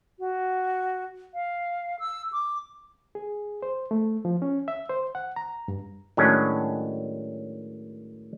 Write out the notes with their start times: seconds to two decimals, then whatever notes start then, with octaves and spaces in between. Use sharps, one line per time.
0.19 F#4
1.34 F5
1.99 E6
2.32 D6
3.15 G#4
3.63 C5
3.91 A3
4.25 F3
4.42 C#4
4.68 E5
4.89 C5
5.15 F#5
5.36 A#5
5.68 G2
6.17 A2 D#3 F#3 G#3 C#4 D4